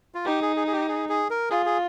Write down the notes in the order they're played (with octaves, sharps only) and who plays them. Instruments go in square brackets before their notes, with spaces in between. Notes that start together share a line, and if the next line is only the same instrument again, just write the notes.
[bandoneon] F4
[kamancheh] D#4 [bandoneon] G4
[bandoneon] G#4
G#4
G#4
G4
G#4
G#4
A#4
[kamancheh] F4 [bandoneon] G#4
[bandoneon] G#4